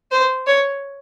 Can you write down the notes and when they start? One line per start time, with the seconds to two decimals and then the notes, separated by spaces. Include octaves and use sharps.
0.11 C5
0.47 C#5